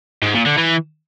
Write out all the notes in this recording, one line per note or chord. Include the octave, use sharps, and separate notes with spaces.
G#2
A#2
D3
E3